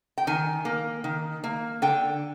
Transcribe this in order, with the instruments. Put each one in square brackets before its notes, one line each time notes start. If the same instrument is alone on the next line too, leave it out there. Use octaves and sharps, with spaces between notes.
[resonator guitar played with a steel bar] G5
D#3 G#5
A#3
D#3
A#3
D3 G5